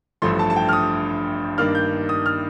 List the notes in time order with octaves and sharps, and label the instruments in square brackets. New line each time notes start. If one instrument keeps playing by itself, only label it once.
[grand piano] A1 G2 F3 A3 C6
A5
A5
G5
F6
D#6
G2 D#3 A#3 D4 F6
G6
D#6
F6